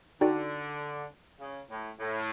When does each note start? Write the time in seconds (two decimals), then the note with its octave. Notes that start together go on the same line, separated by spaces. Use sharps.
0.21 D3 D#4 F#4 A4 D5 G5
1.39 C#3
1.70 A2
2.00 A2